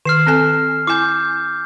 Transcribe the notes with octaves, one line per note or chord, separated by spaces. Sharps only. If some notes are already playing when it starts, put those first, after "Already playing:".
D#3 F6 C7 E7
C4 A4 G#5
E4 G#5 D6 G6